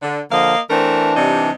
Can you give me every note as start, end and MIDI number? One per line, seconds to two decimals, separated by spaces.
0.02 0.21 50
0.31 0.55 50
0.31 0.55 53
0.31 0.60 58
0.31 0.60 75
0.31 0.60 77
0.70 1.51 52
0.70 1.11 57
0.70 1.11 60
0.70 1.51 62
0.70 1.11 70
1.16 1.54 48
1.16 1.54 55
1.16 1.54 63